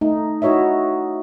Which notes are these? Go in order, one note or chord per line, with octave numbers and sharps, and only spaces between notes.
A3 D#4
D#4 E4 F#4 C#5 D#5 E5